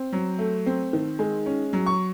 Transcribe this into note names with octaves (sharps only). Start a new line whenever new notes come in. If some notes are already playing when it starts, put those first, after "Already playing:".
Already playing: C4
F#3
A3
C4
D#3
G#3
C#4
F#3
C#6